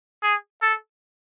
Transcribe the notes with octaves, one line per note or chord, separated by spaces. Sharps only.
G#4
A4